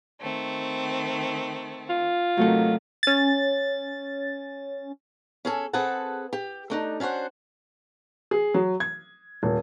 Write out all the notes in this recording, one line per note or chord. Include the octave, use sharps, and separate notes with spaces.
D#3 A3 C4
F4
C3 D#3 F#3 A3 A4
C#4 A6
C#4 G#4 A4
C4 G#4 A4 B4 F#5 A5
G4
A3 D4 D#4
C#4 D4 F#4 C5 F#5
G#4
F#3
G#6
D#1